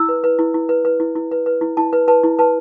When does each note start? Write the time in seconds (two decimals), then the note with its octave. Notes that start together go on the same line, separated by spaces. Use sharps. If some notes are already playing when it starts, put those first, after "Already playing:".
Already playing: E4 E6
0.09 B4
0.24 B4
0.39 E4
0.54 E4
0.69 B4
0.85 B4
1.00 E4
1.15 E4
1.31 B4
1.46 B4
1.61 E4
1.77 E4 A5
1.93 B4
2.08 B4 A5
2.23 E4
2.39 B4 A5